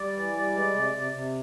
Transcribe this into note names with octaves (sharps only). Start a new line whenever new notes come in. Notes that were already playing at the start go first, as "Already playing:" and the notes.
Already playing: G3 D5
E3
G3
G#3
C3
C3
C3